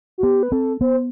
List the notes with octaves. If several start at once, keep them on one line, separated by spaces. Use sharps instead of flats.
F#4
B3 G4
B4
C4 A4
B3 C5